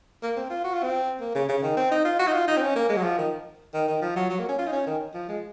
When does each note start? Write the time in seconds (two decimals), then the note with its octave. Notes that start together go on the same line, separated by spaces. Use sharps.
0.23 A#3
0.37 C4
0.50 F4
0.64 F#4
0.74 F4
0.83 C4
1.21 A#3
1.35 C#3
1.49 C#3
1.63 D#3
1.77 C4
1.92 D#4
2.05 F4
2.19 F#4
2.28 D#4
2.33 F4
2.48 D#4
2.57 C4
2.62 C#4
2.76 A#3
2.90 G#3
2.97 F#3
3.04 F3
3.18 D#3
3.74 D#3
3.88 D#3
4.02 F3
4.16 F#3
4.30 F#3
4.39 A#3
4.49 C#4
4.59 F4
4.68 D#4
4.73 C#4
4.87 D#3
5.14 F3
5.29 G#3